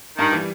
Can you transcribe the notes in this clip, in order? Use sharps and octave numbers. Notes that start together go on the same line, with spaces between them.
G2 D#3
E3 G3